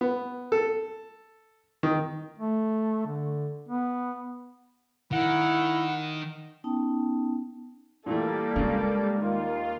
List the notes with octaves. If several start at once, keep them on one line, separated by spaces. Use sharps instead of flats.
B3
A4
D#3
A3
D3
B3
D#3 E4 F#5
B3 C#4 D#4 G5 A5
A#2 E3 G3 A3 A#3 A4 D5
A#2 C#3 G#3
D#2 A#3 D#4 F4